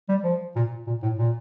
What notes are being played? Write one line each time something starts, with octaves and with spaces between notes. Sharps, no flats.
G3
F3
A#2
A#2
A2
A#2